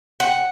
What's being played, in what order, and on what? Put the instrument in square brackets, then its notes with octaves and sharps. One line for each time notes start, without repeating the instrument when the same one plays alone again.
[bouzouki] F#5